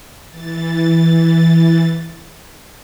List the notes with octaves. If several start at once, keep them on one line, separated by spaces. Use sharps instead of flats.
E3 A6